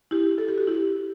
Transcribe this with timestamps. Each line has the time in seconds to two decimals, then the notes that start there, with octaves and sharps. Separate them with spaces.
0.11 E4 G4
0.38 A4
0.48 G4
0.58 F#4
0.67 E4 G4